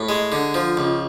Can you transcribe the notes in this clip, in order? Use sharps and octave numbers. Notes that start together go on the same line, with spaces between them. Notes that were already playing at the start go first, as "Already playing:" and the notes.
Already playing: A2
G#3
D3
F3
C#2